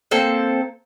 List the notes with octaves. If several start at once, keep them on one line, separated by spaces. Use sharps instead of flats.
A#3 C4 A4